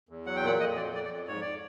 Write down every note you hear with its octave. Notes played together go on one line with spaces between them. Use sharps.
E2
F#3 F#5
G5
A#2 F#5
F2 D#5
F2 D5
F2 D5
D5
F2
G#2 C#5
D5